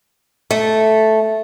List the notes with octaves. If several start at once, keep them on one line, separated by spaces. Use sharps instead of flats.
A3